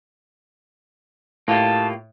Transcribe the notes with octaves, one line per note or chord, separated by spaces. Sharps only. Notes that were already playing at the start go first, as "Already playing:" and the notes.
A2 A#3 F4 G4 A5